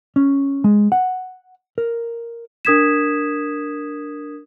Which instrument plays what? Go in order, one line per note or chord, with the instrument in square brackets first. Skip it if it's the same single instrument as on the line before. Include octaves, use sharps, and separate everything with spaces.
[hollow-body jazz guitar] C#4
G#3
F#5
A#4
[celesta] D4 A#4 D#6 G#6 B6 E7